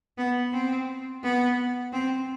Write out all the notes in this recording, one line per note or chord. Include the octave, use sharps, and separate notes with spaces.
B3
C4
B3
C4